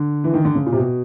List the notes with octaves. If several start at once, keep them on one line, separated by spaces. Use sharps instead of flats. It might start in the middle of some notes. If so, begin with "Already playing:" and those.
Already playing: D3
E3
D#3
D3
C#3
A#2
C3
B2